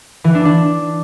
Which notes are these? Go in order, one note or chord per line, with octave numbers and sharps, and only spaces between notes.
E3
D4
D4